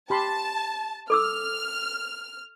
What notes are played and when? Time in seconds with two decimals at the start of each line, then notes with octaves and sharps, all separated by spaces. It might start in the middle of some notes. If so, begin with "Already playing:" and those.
0.10 G4 A5 B5 C6
1.10 A4 D6 E6 F6